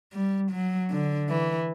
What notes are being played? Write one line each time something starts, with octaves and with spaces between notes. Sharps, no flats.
G3
F#3
D3
E3